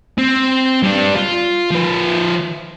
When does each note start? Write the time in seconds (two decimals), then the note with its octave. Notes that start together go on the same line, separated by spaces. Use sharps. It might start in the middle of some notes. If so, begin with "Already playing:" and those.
0.18 C4
0.84 G3 D4
1.16 F4
1.71 F3 B4